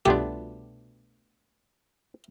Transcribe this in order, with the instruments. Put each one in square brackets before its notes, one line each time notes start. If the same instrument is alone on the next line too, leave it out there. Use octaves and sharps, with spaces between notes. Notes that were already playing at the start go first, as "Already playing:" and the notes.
[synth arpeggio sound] C2 B2 F4 [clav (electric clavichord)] A3 B3 D4 [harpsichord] G4